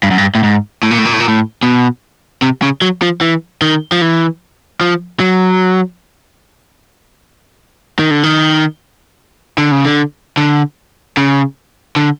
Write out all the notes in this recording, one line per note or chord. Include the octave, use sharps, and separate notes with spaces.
G2
F#2
G2
A2
G#2
A2
A#2
A2
A#2
A2
A#2
A2
B2
C3
C#3
F#3
F3
E3
D#3
F3
E3
F3
F#3
D#3
D3
D#3
D3
C#3
D3
D3
C#3
D3